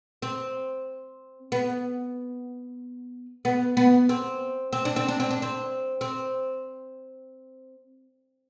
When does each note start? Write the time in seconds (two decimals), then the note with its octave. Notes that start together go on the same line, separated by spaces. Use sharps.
0.22 C4
1.52 B3
3.45 B3
3.77 B3
4.09 C4
4.73 C4
4.85 D4
4.96 C4
5.08 D4
5.20 C4
5.31 D4
5.42 C4
6.01 C4